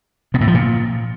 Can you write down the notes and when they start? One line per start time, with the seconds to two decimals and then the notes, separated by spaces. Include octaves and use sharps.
0.34 B2
0.41 A2
0.48 F3
0.54 A#2